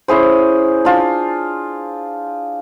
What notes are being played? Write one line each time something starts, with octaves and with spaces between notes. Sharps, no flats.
C#4 E4 G#4 C5
D4 F4